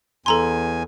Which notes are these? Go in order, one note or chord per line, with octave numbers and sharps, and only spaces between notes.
E2 A4 G#5 A#5 C6